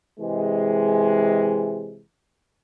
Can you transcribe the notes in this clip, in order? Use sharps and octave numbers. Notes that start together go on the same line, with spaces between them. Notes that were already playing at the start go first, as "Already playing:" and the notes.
C3 E3 G#3